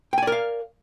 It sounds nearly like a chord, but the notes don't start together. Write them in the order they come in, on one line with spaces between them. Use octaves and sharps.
G5 G#5 D5 A#4 F5